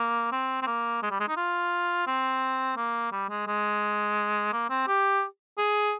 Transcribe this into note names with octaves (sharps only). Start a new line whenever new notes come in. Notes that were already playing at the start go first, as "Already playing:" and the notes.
Already playing: A#3
C4
C4
A#3
G#3
G3
G#3
D#4
F4
C4
A#3
G3
G#3
G#3
A#3
C4
G4
G#4